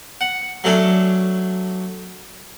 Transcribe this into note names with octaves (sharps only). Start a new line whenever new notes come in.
F#5
F#3 A3 C#4 D4